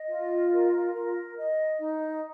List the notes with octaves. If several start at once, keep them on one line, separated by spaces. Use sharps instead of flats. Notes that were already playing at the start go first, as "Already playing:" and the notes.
Already playing: D#5
F4
A#4
A#4
D#5
D#4